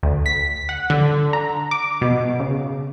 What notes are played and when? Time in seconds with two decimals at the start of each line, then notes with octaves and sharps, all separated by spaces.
0.03 D2
0.26 B6
0.69 F#5
0.90 D3
1.33 A#5
1.71 D6
2.01 B2
2.40 C#3